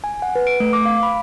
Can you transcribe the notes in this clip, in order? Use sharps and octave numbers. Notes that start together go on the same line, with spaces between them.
G#5
F#5
B4
D7
A3
D6
F5
B5